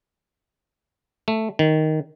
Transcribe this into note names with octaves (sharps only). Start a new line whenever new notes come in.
A3
D#3